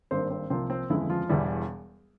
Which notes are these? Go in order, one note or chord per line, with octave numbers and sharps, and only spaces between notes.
G#1 G2 G3 A#3 C4 C5
C4 C5
C2 C3 F3 A#3 C4 C5
C4 C5
G1 F2 C#3 E3 G#3 E4
F3 F4
E1 E2 E3 G3 E4